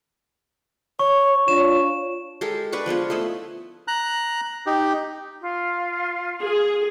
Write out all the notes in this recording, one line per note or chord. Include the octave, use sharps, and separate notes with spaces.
C#5 C#6
D4 F4 C#5 E7
G#3 G4 A4 A#4
D4 B4 D5 C#6
F3 G#3 B3 F4
A3 E4 D#5 E5
A#5 F#6
D#4 G4
F4 F5
G#4